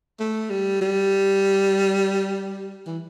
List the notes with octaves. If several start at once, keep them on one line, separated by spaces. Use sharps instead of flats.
A3
G3
G3
E3